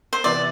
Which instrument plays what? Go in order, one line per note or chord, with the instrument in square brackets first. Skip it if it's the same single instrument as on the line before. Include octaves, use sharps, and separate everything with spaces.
[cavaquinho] C5
[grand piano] C3 E3 B3 E4 [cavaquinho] D5